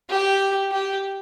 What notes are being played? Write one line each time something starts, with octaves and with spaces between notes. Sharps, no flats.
G4
G4